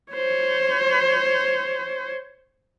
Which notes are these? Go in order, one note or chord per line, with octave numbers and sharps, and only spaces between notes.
C5 C#5